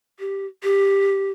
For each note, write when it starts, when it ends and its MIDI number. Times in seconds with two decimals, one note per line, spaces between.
0.19 0.46 67
0.63 1.31 67